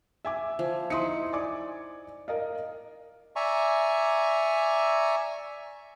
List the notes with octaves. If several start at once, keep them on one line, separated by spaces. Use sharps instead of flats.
E5 G#5 D6
F3
D#4 E4 C6 D#6 C#7
D5 G#5 D6
A#4 D#5 F5
D5 E5 G#5 A#5 C#6